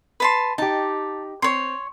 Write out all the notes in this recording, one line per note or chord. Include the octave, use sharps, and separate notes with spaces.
B4 A5 C6
D#4 F4 G4 A5
C4 C#5 C6